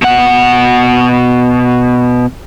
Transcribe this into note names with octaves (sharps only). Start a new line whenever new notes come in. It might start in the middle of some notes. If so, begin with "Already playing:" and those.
B2 F#5